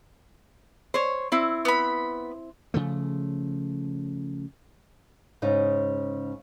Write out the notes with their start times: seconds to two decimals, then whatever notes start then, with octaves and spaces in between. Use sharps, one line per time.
0.94 C5 C#5
1.32 C4 E4
1.65 B3 B5
2.74 C#3 F3 A3
5.42 G#2 C#3 D#4